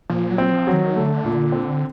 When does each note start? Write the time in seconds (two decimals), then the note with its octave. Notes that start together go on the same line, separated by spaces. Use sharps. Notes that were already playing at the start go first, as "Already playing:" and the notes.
0.10 A#2 F3
0.30 F#3
0.38 C4
0.52 F3
0.67 F#3
0.73 D#3
0.95 D3 A3
1.25 A#2
1.52 C4